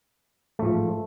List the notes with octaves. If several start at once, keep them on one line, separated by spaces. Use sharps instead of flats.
A1 G#2 F3 A3